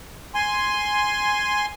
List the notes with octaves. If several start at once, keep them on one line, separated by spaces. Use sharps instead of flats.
G#5 C6